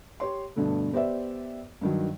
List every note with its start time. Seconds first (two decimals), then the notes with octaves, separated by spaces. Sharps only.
0.20 G4 C#5 C6
0.56 G2 B2 D3 A3
0.93 B3 G4 C5 D5 E5
1.81 G2 D#3 F#3